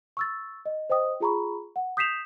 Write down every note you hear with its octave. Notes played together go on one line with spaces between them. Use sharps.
C#6 E6 A6
D#5
C5 D#5 G5 D#6
F4 G#4 A#5 B5 C#6
F#5
D#6 G6 B6 C7 E7 F7